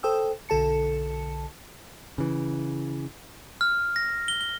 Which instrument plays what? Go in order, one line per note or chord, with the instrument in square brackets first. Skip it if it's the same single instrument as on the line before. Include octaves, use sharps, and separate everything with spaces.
[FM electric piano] A4 C5 G5 D#6 E6
B1 D3 A4 A5 C#7
[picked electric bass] C#3 E3
[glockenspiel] F6
A#6
G7
G7